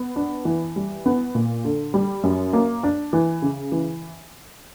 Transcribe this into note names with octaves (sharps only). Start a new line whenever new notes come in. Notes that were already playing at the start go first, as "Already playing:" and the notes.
Already playing: B3
D4
E3
G3
B3
A#2
D3
G3
F#2
A#3
D4
E3
C#3
E3